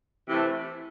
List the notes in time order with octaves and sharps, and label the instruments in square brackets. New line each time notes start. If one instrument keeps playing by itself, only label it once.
[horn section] C3 E3 A3